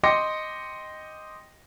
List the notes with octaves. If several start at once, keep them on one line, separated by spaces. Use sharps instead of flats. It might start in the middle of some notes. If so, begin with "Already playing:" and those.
D#5 G5 C6 D6 A#6 C#7